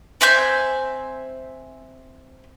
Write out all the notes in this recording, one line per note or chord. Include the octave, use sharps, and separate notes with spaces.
C4 E5 G#5 G6